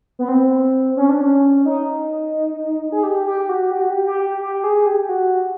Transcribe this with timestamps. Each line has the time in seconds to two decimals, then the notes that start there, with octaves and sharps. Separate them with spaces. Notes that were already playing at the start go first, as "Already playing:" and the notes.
0.19 B3
0.28 C4
0.97 C#4
1.09 D4
1.21 C#4
1.65 D#4
2.92 G#4
3.03 G4
3.26 G4
3.49 F#4
3.71 G4
3.81 F#4
3.90 G4
4.06 G4
4.41 G4
4.64 G#4
4.86 G4
5.09 F#4